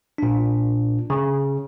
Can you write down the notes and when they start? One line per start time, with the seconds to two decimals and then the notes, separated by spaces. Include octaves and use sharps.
0.18 A#2 D4
1.10 C#3